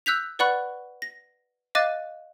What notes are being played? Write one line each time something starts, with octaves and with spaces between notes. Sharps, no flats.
E6 F#6 G6 B6 F7
B4 D5 F#5 B5 C#6 F#6
A#6
D#5 F5 D6 F#6 A6 D#7